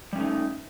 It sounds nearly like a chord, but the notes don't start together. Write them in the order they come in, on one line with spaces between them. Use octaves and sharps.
G3 C#4 A3 D#4